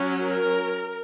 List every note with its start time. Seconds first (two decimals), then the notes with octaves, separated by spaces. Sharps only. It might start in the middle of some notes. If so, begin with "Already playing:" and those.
Already playing: F#3 C#4
0.21 A#4